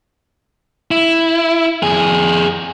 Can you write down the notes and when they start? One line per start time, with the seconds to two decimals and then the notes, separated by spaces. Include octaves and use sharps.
0.91 E4
1.83 F2 G#4